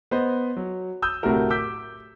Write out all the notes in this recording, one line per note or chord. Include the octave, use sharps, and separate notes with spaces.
B3 C5 D#5
F#3
D#6 E6 G6
D1 A2 C3 A3 F#4 A#4
D6 E6 G6 B6